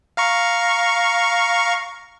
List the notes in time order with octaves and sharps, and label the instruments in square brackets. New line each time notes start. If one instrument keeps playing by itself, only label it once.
[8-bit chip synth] F5 A#5 C#6